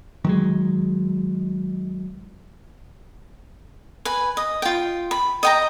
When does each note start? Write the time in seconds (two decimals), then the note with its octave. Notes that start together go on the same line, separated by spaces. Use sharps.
0.25 D#3 F#3 G#3
4.05 B4 G#5
4.37 D#5
4.62 F4 G5
5.11 B5
5.43 D#5 G5 A#5